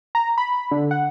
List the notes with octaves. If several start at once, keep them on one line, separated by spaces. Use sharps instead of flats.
A#5
B5
D3
F#5